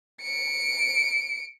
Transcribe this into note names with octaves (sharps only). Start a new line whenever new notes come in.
C#7 D7